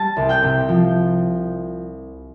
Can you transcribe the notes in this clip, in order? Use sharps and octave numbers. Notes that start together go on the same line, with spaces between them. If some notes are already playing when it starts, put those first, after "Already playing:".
Already playing: G3 A5 A6
C2
G5 G6
C3
F3